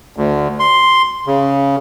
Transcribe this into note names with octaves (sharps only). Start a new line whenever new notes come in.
D2
C6
C#3